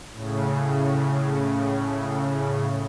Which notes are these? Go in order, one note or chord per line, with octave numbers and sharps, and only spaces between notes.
A2 C#3